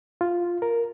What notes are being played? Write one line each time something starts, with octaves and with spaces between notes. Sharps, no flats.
F4
A#4